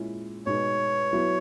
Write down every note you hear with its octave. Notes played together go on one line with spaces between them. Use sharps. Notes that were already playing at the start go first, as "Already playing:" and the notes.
Already playing: A#2 G#3 C#4 E4
B2 G#3 B3 D#4 C#5
F#3 B3 E4